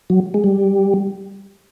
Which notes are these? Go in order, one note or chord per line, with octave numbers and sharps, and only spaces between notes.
F#3
G#3
G3